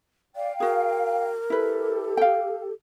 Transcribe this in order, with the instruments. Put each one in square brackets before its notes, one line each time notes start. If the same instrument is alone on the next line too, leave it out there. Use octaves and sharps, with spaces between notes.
[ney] D5 [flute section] F5 G5
[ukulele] F#4 G#4 [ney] A#4
[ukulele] E4 B4 [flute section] G4 A4
[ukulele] F5 G5